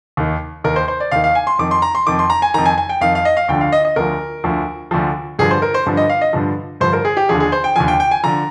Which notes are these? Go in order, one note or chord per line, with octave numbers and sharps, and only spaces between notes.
D#2 D#3
D#2 D#3 A#4
C5
C5
D5
D#2 D#3 F5
F5
G#5
C6
F2 D#3 D6
C6
A#5
C6
F2 D#3 D6
C6
A#5
G#5
F2 D#3 A#5
G#5
G#5
G5
F2 D#3 F5
F5
D#5
F5
D2 D3 F3 G5
F5
D#5
D#5
D2 D3 F3 A#4
D2 D3 F3
D2 D3 F3
G2 D3 F3 G#4
C5
A#4
C5
G2 D3 F3
D#5
F5
D#5
G2 D3 F3
G2 D3 F3 C5
A#4
G#4
G4
D#2 D3 F3 G#4
G#4
C5
G5
D#2 D3 F3 G#5
G5
G5
G#5
D3 F3 A#5